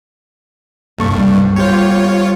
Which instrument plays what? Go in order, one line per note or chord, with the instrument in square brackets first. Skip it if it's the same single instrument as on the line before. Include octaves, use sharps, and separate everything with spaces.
[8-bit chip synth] C2 G2 [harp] A#3 A4 C#6
[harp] G3
[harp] B3 G4 C5 [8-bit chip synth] F4 C#5